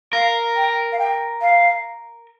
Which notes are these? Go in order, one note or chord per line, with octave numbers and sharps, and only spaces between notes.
A#4 F5
G5
F5
G5
F5